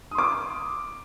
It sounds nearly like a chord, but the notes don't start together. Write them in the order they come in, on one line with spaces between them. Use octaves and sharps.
D#6 C6 D6